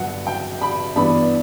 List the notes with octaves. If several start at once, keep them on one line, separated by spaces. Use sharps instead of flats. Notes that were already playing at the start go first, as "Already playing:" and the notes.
Already playing: G1 G2 F#3 F#5
G5
B5
G2 E3 B3 D4 B5